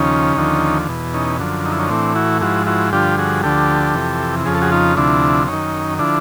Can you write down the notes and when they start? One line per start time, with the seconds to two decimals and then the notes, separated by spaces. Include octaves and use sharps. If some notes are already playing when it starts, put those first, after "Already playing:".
Already playing: D#2 C#3 F3 C#4 D#4
0.37 D#2 D3 F3
0.89 E2 B2
1.14 C#4 D#4
1.39 F#2 D3 F3
1.65 D#4
1.72 E4
1.79 C#4 D#4
1.90 A2 E3 C4 D4
2.15 E4 F#4
2.41 G#2 F3 E4 F#4
2.67 E4 F#4
2.93 G2 D3 F3 F4 G4
3.18 F#4 G#4
3.43 D2 D3 F3 G4 A4
3.95 F2 C3 E3
4.45 F2 C#3 F3 G#4
4.54 A4
4.62 F#4 G#4
4.72 D#4 F4
4.97 D2 C3 F3 D4 E4
5.48 F#2 D#3 C#4 D#4
5.99 D3 F3 D4 E4